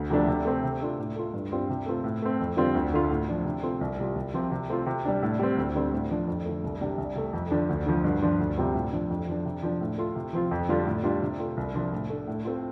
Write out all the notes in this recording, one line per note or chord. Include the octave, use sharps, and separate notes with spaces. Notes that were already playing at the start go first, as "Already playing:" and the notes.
Already playing: D2
C3 F3 A3 D4
C3
A3 C4
C3
A3 D4 F4
A2
A3 F4
G2
G3 C4 F4
C3
A3 C4 F4
A2
A3 C4
F2
D3 G3 C4 F4
D2
D3 A3 F4
A2
F3 D4
C3
A3 C4 F4
C2
C3 G3 F4
C2
C3 F3 C4 F4
C3
A3 C4 F4
C3
G3 D4
A2
G3 C4
D2
D3 G3 C4
A2
F3 D4
F2
D3 A3
C2
C3 G3 D4
C2
C3 A3
F2
D3 F3 D4
D2
D3 F3
G2
F3 D4 F4
D2
C3 G3 C4 F4
A2
F3 D4
F2
F3 D4
C3
F3 D4
A2
A3 F4
C3
F3 C4 F4
F2
D3 G3 D4 F4
A2
G3 D4 F4
C3
A3 F4
C2
C3 F3 D4 F4
A2
A3 D4
A2
A3 C4 F4